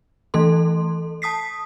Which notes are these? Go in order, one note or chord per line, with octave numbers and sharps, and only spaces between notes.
E3 A3 A4 C6
A5 D#6 B6 C7